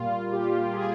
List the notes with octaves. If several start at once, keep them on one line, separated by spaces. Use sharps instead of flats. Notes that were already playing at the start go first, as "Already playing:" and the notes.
Already playing: A#2 G3 A#3 F4
G4
G#4